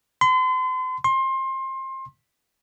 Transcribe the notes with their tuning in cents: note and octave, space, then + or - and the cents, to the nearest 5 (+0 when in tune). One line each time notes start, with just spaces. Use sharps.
C6 -40
C6 +25